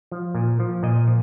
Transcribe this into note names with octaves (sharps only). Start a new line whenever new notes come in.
F3
A#2
F3
A#2 D#5
F3